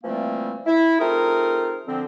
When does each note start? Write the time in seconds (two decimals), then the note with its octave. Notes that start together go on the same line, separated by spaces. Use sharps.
0.03 E3 F3 G3 A3 A#3 C4
0.66 E4
0.99 A3 C4 D#4 F4 G#4 A#4
1.87 D3 F3 C4